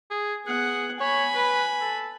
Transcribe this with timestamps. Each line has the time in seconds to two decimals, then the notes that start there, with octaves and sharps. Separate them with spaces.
0.11 G#4
0.46 B3 G#4 F#5
1.00 C#5 G#5 B5
1.35 B4
1.81 A4